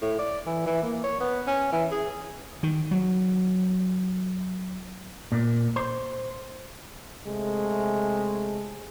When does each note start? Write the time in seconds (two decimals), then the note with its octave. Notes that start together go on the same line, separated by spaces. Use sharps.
0.02 A2
0.19 D5
0.46 E3
0.66 E3
0.83 A#3
1.04 C#5
1.20 B3
1.47 C#4
1.72 E3
1.91 G#4
2.63 D#3
2.91 F#3
5.32 A#2
5.76 C5
7.27 C3 G#3 A3